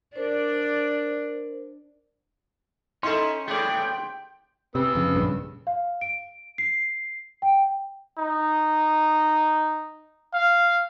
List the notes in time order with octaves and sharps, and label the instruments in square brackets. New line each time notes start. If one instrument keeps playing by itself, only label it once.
[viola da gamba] D4 D5 [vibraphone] A#4 C5
[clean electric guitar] C#4 [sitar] D#4 E4 A4 [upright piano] C6
[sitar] A2 G#4 [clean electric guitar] A3 B3 D5 [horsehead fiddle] G5
[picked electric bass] C3 [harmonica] B3 E6
[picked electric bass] F2 C#3
A#1 G2 C#3
[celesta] F5
D7
C7
G5
[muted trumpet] D#4
F5